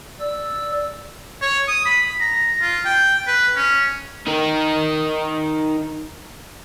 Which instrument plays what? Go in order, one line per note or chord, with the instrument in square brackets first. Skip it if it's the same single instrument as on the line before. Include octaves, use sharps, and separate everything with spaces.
[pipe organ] D5 E6
[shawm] C#5
D#6
B5
A#5
F4
G5
B4
C#4
[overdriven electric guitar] D#4 A#4